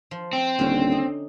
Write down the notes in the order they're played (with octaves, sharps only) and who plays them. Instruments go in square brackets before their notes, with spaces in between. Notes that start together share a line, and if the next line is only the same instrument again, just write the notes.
[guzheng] F3
[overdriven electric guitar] C4
[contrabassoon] D#1 [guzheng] D3 C#4
[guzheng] D#4